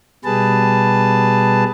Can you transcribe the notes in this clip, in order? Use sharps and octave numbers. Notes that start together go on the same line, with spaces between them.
B2 G3 G#4 B4 A5